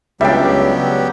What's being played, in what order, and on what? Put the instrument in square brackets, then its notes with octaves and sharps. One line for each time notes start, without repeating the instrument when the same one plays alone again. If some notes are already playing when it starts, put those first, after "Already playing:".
[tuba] C#2 [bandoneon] F#3 B3 G4 [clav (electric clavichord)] G3 D4 [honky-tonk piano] E5 G5